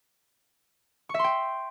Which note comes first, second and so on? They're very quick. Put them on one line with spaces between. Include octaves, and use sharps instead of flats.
C#6 E5 C6 G5